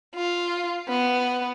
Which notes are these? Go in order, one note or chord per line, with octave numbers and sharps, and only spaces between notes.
F4
B3